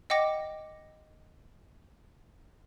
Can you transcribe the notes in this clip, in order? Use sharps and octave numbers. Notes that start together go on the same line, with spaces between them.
D#5 F#5 G5 D6 A#6